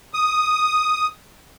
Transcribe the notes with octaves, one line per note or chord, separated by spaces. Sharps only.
D#6